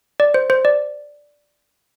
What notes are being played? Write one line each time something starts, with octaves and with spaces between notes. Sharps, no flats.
D5
C5
C5
D5